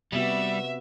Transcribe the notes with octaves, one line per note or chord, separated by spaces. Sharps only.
C3 G3 B3 F#4 E5